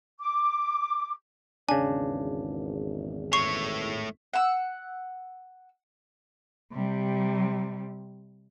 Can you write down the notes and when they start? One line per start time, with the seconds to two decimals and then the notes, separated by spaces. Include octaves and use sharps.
0.20 D6
1.69 G#1 E2 C#3 D4 G#5
3.33 A3 C#5 C#6 C7
4.33 F#5 E6
6.73 C3 G3